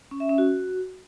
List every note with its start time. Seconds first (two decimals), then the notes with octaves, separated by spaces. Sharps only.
0.11 C#4
0.20 E5
0.29 C#4
0.38 F#4